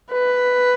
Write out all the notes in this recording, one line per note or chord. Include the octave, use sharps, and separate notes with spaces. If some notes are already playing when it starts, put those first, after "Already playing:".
B4